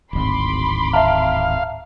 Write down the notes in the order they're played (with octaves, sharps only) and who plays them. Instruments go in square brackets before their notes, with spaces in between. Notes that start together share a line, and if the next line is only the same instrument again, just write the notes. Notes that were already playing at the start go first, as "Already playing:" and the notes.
[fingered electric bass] D1 G#1 [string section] B5 C6 D6
[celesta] E5 A5 A#5 [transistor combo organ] F5